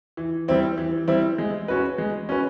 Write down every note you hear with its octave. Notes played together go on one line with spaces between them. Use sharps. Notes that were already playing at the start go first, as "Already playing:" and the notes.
E3
G3 C4 E4
E3
G3 C4 E4
G#3
C#4 F#4 B4
G#3
C#4 F#4 B4